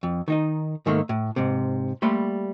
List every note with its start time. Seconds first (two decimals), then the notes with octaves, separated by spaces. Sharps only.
0.03 F2
0.28 D#3 D#4 D#5
0.86 G#2 D#3 A3 A#3
1.09 A2
1.36 G#2 C3
2.02 G3 A3 A#3 B5 C6